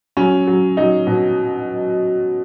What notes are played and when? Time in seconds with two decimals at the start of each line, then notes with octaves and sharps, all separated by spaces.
0.17 F#3 C#4
0.47 F#3
0.77 F#3 D#4
1.07 B2